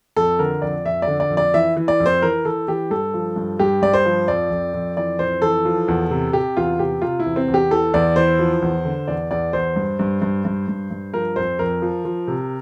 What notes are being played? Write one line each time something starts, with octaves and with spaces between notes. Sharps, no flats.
F2 A4
D3 A#4
F2 D5
F2 E5
D5
D3
D5
F2
D5
E3 E5
E3
D5
F2
C5
E3 A#4
E3 A4
E3 G4
G2 A4
F3
G2
G2 G4
G2 D5
C5
F3
F2 D5
F2
F2
E3 D5
F2 C5
E3 A4
F3
E2
C3
C3 G4
E2 F4
C3 G4
C3 F4
E4
E2
C4
E2
G4
E3 A4
E2 D5
E3 C5
F3
E2
D3
E2 D5
E2 D5
E2 C5
G2
G2
G2
G2
G2
G2
F3 A#4
F2 C5
F2 A#4
F3
F3
C3